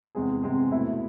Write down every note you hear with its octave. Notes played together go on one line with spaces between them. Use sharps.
E2 C3 G#3 C4 G#4
E2 C3 G#3 C4 G#4
B2 A3 E4 A4